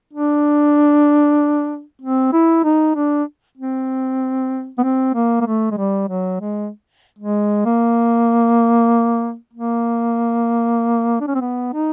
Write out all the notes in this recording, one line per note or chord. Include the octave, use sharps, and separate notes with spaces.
D4
C4
E4
D#4
D4
C4
B3
C4
A#3
A#3
A3
G#3
G3
F#3
G#3
G#3
A#3
A#3
D4
C#4
C4
B3
D#4